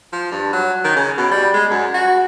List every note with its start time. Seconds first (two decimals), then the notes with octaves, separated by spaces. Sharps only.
0.13 F3
0.31 G2
0.53 F#3
0.84 D#3
0.96 C#3
1.18 B2
1.31 G3
1.54 G#3
1.71 F#2
1.94 F#4